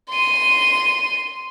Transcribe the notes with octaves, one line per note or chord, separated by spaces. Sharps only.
C6 D#7